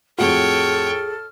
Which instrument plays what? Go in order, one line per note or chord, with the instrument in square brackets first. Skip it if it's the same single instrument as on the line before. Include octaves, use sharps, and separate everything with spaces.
[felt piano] F2 A2 F#4 [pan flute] G#4 [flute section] A4 F6 [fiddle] C#5 G5